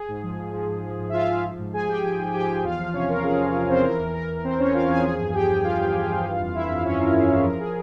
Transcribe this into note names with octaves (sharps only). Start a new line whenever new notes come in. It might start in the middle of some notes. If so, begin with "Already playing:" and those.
Already playing: G#4
G#2
F3
G#2
F3
G#2
F3
G#2
E5
F3 F4 F5
G#2
F3
G#2
F3 G#4 G#5
G#2 G4 G5
F3
G#2
F3 G4 G5
G#2
E2 F4 F5
F3
C3 C#4 C#5
E2 A#4
E2 G#4
F3
C3
E2 C4 C5
E3 A#4
E2
E3 A#4
E2
E3 C4 C5
E2 C#4 C#5
E3 F4 F5
E2 G#4 G#5
F3 G#4 G#5
G2
F3 G4 G5
G2
F3 F4 F5
G2
F3
G2
E3
F2
E3 E4 E5
F2
E3 C#4 C#5
F2 A#4
E3 G#4
F2
F3 A#4
G#4